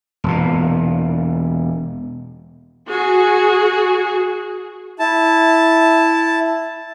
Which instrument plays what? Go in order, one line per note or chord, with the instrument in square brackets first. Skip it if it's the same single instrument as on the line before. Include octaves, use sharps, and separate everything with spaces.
[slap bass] E1 A#2
[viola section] F#4 G#4
[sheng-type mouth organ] E4 A5